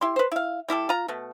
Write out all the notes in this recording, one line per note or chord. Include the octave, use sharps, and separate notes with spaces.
E4 G4 C6
B4 C5
E4 F5
G3 E4 G4 A4
F4 A#5
B2 A3